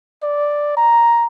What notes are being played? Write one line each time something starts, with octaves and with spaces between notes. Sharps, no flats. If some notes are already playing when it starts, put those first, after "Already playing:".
D5
A#5